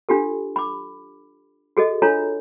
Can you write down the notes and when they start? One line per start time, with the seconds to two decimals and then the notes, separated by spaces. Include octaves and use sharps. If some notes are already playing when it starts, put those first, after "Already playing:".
0.09 D4 F4 G4 A4
0.56 B5 D6
1.77 F#4 G#4 A4 D#5
2.02 D4 F4 A4 C#5 A#5